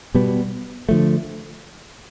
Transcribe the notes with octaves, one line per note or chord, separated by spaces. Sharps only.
B2 G3 B3
D3 F3 A3